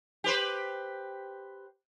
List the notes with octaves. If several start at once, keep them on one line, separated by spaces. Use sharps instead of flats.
G4 B4 C5